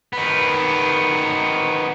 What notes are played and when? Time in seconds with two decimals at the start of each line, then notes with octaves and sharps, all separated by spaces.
0.13 D#3 B3